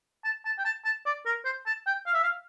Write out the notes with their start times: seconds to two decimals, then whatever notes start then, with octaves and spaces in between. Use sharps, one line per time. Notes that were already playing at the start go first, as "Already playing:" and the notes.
0.24 A5
0.45 A5
0.58 G5
0.65 A5
0.85 A5
1.06 D5
1.26 A#4
1.45 C5
1.66 A5
1.87 G5
2.06 F5
2.14 E5
2.23 F5